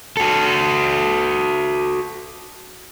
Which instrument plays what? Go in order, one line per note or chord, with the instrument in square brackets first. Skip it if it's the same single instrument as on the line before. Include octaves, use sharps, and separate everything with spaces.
[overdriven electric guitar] F#4 A4